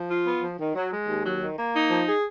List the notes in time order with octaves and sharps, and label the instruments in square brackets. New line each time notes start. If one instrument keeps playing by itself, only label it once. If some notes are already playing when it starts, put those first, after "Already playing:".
Already playing: [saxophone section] F3
F4
B3
F3
D#3
F#3
G#3
D#2
F#3
D#3
A#3
D#4
F3
G#4